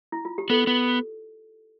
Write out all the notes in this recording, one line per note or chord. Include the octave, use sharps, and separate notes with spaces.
E4
F4
G4
B3 A4
B3